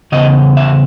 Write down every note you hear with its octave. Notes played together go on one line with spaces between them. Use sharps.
E2 C#3 D#5
E5